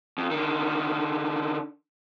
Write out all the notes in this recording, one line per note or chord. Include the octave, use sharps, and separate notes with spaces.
F2
D3 D#3